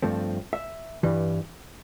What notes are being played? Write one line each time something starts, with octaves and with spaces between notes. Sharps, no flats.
G2 F3 A3 C4
E5
G2 E3 G3